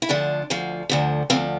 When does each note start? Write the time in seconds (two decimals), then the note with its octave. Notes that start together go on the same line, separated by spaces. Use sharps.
0.02 E4
0.09 D2 D3 F3 D4
0.50 D2 D3 F3
0.89 D2 D3 F3
1.30 D2 D3 F3 C4